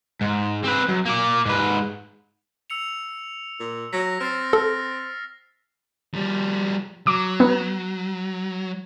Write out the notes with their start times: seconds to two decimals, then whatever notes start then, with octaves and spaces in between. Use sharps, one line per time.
0.21 G#2
0.65 C4 B4
0.89 F#2
1.06 A#3 D5
1.46 G#2 B4
2.70 E6 C#7 F7
3.60 A#2
3.93 F#3 A#6 B6
4.20 C4 F6 A6 C7
4.53 A4 F6
6.14 F3 G3
7.07 F#3 D6
7.40 B3